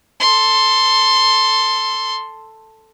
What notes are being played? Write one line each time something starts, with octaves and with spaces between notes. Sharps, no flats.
A4 C6